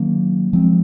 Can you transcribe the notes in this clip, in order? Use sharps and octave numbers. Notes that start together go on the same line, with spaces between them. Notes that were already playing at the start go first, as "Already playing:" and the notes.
Already playing: D#3 F#3 A#3 C#4
F3 G#3 C4